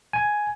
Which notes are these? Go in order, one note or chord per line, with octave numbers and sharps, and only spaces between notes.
G#5